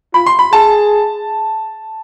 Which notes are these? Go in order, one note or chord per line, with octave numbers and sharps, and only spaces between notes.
F4 B5
C6
B5
G#4 A5